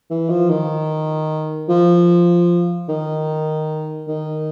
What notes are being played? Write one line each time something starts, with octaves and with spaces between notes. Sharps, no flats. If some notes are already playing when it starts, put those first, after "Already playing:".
E3
F3
D#3
F3
D#3
D#3